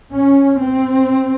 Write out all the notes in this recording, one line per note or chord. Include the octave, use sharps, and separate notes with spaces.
C#4
C4